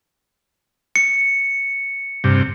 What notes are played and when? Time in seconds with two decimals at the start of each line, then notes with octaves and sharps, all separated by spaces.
0.96 C#7
2.24 G2 C3